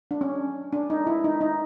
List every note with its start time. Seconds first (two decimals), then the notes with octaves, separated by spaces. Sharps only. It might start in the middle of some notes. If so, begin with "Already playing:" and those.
0.11 D4
0.21 C#4
0.72 D4
0.90 D#4
1.07 E4
1.24 D#4
1.41 D#4